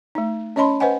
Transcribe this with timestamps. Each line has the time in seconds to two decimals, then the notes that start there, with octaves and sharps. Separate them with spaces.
0.15 A3 D#4
0.56 C#4 C#5 D#5 A5 B5 C6
0.80 B4 C5 D#5 F#5 G#5